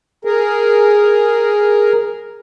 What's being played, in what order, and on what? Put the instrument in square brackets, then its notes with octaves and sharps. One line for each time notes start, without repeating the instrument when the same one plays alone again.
[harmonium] G#4 A#4